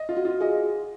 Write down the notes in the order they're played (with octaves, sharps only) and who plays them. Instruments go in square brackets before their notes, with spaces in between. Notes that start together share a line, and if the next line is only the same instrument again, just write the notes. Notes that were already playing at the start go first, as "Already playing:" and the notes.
Already playing: [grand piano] D#5
F4
[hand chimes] F#4
[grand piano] F4
[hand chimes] G#4 [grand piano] D#5